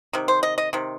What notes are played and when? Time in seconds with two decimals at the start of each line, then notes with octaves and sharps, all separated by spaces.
0.13 C3 D#3
0.28 C5
0.43 D#5
0.58 D#5
0.73 C3 D#3